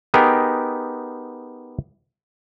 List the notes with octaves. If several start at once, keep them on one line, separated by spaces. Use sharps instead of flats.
B3 D#4 G4 G#4 A#4 G5